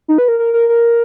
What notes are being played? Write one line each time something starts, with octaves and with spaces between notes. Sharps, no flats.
D#4
B4
A#4
A#4
A#4
A#4